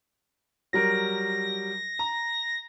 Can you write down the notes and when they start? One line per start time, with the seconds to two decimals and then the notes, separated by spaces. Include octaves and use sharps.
0.73 F#3 G3 A#4 A#6
1.99 A#5